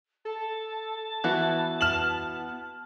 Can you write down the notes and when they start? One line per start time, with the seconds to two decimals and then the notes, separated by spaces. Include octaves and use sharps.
0.25 A4 A5
1.24 E3 B3 E4 F#4
1.81 F6 E7 F#7